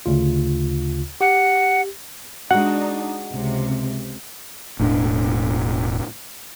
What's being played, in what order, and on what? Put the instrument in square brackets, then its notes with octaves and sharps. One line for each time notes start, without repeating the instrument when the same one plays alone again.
[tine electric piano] D2 C#3 F4
[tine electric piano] G4 [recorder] F#5
[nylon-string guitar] G#3 F#4 [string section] D4 D#4 [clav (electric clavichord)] F#5
[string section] C#2 C3
[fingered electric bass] E1 A2 C#4 D4